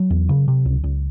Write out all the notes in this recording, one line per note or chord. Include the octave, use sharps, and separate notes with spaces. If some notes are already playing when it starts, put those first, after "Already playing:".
Already playing: F#3
E2
C#3
C3
C#2
C#2